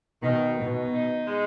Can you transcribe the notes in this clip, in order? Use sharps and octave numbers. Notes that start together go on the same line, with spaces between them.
B2 D#3
B2 D#3
D#4
G#3